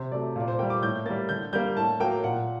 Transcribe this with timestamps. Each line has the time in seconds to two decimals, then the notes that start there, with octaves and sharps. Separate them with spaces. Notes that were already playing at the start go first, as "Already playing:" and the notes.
Already playing: C3 C5
0.11 F#3 A3 D5
0.36 A#2 D5
0.48 C5
0.59 G3 A#3 G5
0.70 D6
0.82 A2 G6
1.05 G3 A#3 A6
1.29 D3 G6
1.53 G3 A#3 G6
1.76 A2 A5
2.00 F#3 A#3 G5
2.24 A#2 F#5